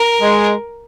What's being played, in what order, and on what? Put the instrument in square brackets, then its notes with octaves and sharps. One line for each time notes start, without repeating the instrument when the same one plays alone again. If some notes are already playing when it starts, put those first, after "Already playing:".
Already playing: [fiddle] A#4
[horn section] G#3